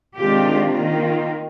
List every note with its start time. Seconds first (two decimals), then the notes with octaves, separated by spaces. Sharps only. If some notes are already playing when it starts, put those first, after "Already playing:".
0.16 C3 D#3 G#3 D4 F4 G4
0.71 D#3 A#3 F4